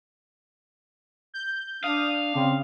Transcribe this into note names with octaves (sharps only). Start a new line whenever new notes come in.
G6
D4 F5 D#6
C#3 C4